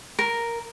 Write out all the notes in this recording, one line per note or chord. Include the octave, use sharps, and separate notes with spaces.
A#4